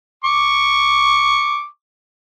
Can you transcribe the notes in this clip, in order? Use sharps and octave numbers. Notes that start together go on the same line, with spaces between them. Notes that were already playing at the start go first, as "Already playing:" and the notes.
C#6 D6